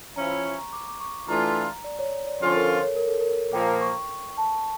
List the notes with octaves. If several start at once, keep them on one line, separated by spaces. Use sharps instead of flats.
F3 C#4 E4 A#5
C#6
A#5
D6
D6
C#6
E3 A3 D4 F4 A#5
D5
C#5
D5
D3 F3 C#4 F4 A4
A#4
C#5
C#5
A#4
A4
A#4
A#2 F3 A#3 G5
C#6
A5